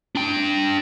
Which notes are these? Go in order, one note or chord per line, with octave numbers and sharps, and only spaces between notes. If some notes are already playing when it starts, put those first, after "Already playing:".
D4 G5